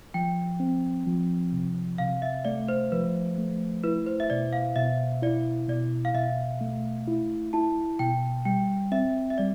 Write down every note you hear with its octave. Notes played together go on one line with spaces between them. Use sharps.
F3 G5
C4
F3
C3
C3 F5
E5
A3 D5
C5
F3 B4
A3
E4 B4
C5
E5
B2 D5
F5
B2 E5
E4 D5
B2 D5
F5
B2 E5
A3
E4
E4 A5
B2 G5
G3 G5
C4 E5
E5
G3 D5